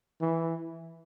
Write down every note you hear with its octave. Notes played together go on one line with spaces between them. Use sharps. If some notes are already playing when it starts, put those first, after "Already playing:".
E3